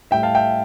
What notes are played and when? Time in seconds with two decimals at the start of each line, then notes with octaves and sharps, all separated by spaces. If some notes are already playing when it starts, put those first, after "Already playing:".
0.11 A2 G3 E5 G5
0.23 F5 A5
0.35 E5 G5